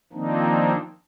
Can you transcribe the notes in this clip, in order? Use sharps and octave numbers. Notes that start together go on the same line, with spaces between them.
D#3 F3 A#3 C4 D4 D#4